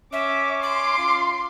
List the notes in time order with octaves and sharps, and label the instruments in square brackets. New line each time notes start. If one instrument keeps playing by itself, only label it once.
[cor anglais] C#4 [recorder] E5 [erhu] D6
[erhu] C6 [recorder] D6
[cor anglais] F4